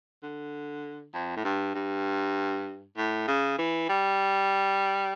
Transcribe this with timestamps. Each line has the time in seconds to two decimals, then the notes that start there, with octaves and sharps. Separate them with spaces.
0.23 D3
1.14 F2
1.36 A2
1.44 G2
1.75 G2
2.97 A2
3.27 C#3
3.58 E3
3.89 G3